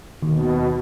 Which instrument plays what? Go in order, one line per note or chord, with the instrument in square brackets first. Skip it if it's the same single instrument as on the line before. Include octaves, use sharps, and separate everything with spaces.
[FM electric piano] D#2 [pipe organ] B2